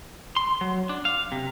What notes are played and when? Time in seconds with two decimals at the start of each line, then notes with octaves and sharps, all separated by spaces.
0.36 C6
0.61 F#3
0.89 D4
1.05 F5
1.32 C3